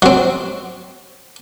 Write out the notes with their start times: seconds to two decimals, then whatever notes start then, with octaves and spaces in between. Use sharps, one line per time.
0.02 F#3 C4